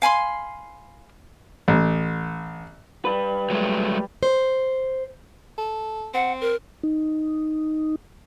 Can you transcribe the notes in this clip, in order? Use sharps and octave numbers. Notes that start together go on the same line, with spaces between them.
F5 G#5 B5 C6
A1
G3 B4
F#3 G#3 A3
C5
A4
C4 F#5
A#4
D#4